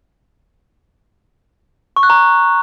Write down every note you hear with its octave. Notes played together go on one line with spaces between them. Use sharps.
C#6
F#6
A#5